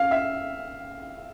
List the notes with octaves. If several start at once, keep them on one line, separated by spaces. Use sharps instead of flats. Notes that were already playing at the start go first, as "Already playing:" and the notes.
Already playing: F5
E5